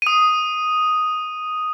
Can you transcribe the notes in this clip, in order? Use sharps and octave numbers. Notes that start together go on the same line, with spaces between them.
D#6 D#7